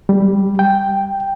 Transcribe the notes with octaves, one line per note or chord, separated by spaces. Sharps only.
G3
G5